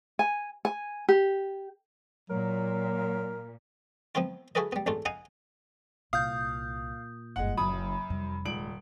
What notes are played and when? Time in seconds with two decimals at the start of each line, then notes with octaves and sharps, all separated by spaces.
0.19 G#5
0.65 G#5
1.09 G4
2.30 A#2 F#3 A#4
4.15 F3 B3 C4 E4 F4
4.55 E4 F#4 G#4 A4 B4 D#5
4.72 G3 B3
4.86 A1 E2 A3 D4 F4
5.05 D#4 D#5 F5 F#5 G#5
6.13 C2 A#2 F5 D#6 G6
7.36 F#1 G2 G#3 F#5
7.57 F#1 F#2 B5 D#6
8.10 F1 F2 G3
8.45 D#1 G#3 D7 F#7